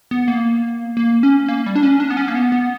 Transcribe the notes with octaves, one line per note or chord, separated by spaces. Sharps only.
B3
A#3
A#3
C#4
A#3
G3
D4
C#4
D4
B3
C#4
A#3
B3
B3